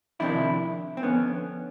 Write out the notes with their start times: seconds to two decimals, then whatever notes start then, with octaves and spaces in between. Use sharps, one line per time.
0.20 F2 C3 D#3 D4 E4
0.97 C4
1.03 F2 D3 B3 C#4